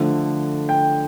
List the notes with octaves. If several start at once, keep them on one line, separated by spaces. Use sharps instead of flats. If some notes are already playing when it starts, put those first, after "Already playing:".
Already playing: D3 F3 A3
G5